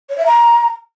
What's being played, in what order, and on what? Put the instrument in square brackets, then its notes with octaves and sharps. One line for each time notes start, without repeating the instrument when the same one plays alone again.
[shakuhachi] C#5
E5
A#5